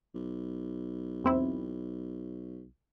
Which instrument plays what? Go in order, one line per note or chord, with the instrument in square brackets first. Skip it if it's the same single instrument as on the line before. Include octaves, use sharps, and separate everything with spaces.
[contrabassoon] B1
[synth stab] E2 C4 E4